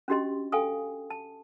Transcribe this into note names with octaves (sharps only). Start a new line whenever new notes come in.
C#4 D4 F#4 G4 D#5 C6
A4 F5 G5 G#5 C#6 D#6
A5